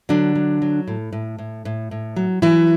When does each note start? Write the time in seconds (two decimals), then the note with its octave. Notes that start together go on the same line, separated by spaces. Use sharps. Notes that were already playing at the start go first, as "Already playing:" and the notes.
0.09 D3 F#3 D4
0.35 F#3
0.62 F#3
0.88 A2
1.13 A2
1.39 A2
1.65 A2
1.91 A2
2.16 F#3
2.42 E3 F#3 E4